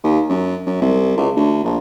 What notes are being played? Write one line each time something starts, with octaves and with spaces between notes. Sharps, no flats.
D#2
F#2
F#2
C2
C#2
D2
A#1